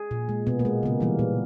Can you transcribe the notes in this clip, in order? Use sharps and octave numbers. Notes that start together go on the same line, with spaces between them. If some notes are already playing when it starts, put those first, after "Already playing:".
Already playing: G#4
A#2
G#3
B2 B3
A#3
G#3
C#3 A#3
E3 G3 A#3
A#2 B3